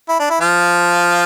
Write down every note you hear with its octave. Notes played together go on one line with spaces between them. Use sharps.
E4
D4
E4
F3 F4